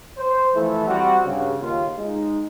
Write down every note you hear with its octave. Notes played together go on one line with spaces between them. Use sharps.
C5
E3 F3 A3 E4 A4
G3 C4 F#4
G2 C#3
D#2 F4
G#3 D#4